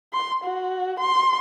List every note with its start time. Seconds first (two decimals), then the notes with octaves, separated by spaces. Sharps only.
0.13 C6
0.44 F#4
1.00 C6